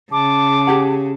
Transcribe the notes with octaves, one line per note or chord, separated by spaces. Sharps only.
C#3 A5 D6
G4 G#4 F#5